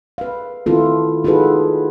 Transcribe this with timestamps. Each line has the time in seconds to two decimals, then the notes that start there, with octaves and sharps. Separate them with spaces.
0.18 B4 F5
0.66 D#3 C4 E4 F4 A4
1.24 D#4 F4 F#4 G#4 A4 B4